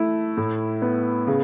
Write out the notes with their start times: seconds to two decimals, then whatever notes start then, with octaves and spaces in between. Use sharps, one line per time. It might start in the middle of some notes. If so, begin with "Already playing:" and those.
Already playing: A3 E4
0.37 A2
0.82 B3
1.27 C#3